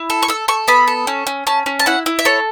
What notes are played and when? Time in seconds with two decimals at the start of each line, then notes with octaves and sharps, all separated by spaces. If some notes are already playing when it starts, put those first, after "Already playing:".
Already playing: E4
0.10 A4
0.23 C#6
0.28 A4 E6
0.48 A4 C#6
0.68 B3 B5
0.88 A4
1.07 C#4
1.27 C#4
1.47 C#4 A5
1.66 C#4
1.79 A5
1.86 E4 F#5
2.06 E4
2.19 E5
2.25 A4 C#5